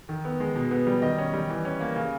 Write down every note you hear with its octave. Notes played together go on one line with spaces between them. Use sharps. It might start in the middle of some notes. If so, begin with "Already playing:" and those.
D#3
B3
G#3
B2
B3
G3
D#3 D#5
C#4
G3
E3
C#4
A#3
C#3